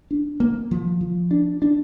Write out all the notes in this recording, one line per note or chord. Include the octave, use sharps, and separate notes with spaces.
D4
A#3
F3
F3
D4
D4